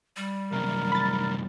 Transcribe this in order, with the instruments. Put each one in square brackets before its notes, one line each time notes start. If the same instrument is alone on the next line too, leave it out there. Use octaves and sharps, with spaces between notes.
[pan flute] G3
[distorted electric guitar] C2 F#2 [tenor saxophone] A#4
[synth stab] B5 A6